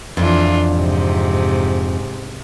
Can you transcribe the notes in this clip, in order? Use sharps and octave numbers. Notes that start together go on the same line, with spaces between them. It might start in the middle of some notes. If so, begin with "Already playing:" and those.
F2 E3 D4 F4
G#2 C3